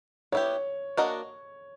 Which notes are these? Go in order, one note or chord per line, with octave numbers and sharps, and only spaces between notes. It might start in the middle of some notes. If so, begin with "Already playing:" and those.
B3 E4 G4 C#5
A#3 D4 F#4 A#4 D#5